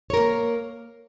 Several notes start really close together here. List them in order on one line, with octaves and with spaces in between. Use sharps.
C#5 A#4 A#3